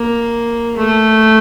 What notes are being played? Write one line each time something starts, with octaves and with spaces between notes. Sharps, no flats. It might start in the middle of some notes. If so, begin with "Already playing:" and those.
Already playing: A#3
A3